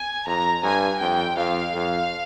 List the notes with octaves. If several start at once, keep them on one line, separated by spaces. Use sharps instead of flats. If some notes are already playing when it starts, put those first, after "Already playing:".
Already playing: G#5
F2 A#5
G2 G#5
F2 G5
F2 F5
F2